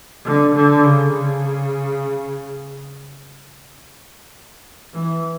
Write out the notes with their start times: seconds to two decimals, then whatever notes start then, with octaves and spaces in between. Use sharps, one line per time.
0.25 D3
0.54 D3
0.84 C#3
1.13 C#3
4.94 E3